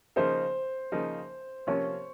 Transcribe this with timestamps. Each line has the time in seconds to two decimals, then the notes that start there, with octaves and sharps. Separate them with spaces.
0.16 C#3 F3 A#3 D#4 C5
0.92 C#3 F3 A#3 D#4
1.67 C3 F3 A#3 C#4 C#5